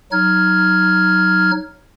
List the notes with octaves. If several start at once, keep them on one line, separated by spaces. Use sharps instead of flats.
F#3 D#4 F6 G#6